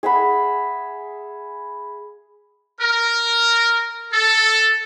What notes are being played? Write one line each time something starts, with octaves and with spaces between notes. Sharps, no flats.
G#4 E5 F#5 B5
A#4
A4